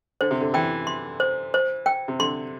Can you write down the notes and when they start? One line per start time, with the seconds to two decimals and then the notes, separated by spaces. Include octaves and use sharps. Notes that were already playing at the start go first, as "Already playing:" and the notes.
0.21 D3 C5
0.31 C3
0.40 D3
0.54 E3 G5
0.87 C6
1.20 C5
1.54 C5
1.86 G5
2.08 C3
2.19 D3 C6